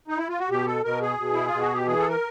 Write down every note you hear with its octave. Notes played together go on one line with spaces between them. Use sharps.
D#4
E4
F4
F#4
B2 G4
A4
B2 A#4
G#4
B2
E4
F4
B2
F#4
G4
E3 G#4
A4
A#4